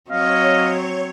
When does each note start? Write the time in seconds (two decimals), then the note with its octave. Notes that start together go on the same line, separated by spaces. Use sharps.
0.11 F#3 C4 C#5 D#5 F5